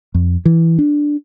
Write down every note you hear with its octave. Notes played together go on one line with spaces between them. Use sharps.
F2
E3
D4